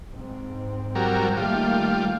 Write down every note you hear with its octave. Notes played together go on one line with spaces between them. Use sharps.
G#2 C4
F#3 G3 A#4
D#3 G3 A3 A#3 F4